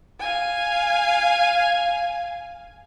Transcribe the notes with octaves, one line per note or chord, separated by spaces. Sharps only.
F5 G#5